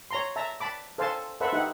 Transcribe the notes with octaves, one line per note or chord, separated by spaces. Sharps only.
C#5 A#5 C6
E5 A5 A#5
A5 B5 D6
A4 C5 F5 G#5 A5
A4 B4 C5 E5 F#5
D#4 G4 E5 F#5